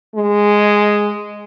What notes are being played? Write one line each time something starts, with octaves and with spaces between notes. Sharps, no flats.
G#3